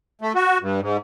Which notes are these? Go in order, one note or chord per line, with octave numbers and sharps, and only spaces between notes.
A3
F#4
G2
G#2